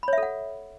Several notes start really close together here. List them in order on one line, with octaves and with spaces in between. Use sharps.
B5 C#5 E5 A4 F#5